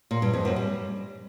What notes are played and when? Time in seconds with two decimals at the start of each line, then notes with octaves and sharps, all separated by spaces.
0.11 A#2
0.22 G2
0.33 F2
0.45 F#2
0.56 G3